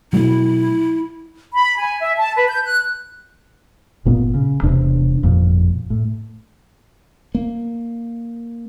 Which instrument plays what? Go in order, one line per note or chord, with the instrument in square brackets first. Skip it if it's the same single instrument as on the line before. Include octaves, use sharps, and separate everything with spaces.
[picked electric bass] B2 F#3 A3 [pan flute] E4
[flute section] B5
G#5
E5
A5
B4
G6
F#6
[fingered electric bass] G1 A#2 A#3 B3
C#3
E1 E2 C3 D4
G1 F2 A#2
A2
A#3